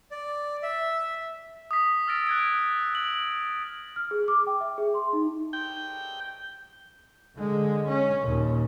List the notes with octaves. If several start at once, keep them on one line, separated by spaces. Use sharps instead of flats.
D5
E5
D#6 B6
E6 F6 A6 A#6 D7
F#6 G#6 D7
F#6 F#7
F6
G#4
D6
G5
E5
G#4
C6
D#4
G5
D3 G#3
C#4
D#2 A#2